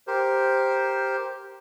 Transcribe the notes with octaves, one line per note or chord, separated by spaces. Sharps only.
G4 A#4 C5